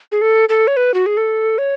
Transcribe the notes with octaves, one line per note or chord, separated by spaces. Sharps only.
G#4
A4
A4
C#5
B4
F#4
G#4
A4
C#5